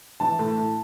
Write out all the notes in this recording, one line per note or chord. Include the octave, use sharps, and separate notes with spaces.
E3 A5
A2
A2